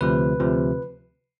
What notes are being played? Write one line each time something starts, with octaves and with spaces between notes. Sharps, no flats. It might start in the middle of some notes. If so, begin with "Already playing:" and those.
D2 C3 F3 B4
D2 C3 F3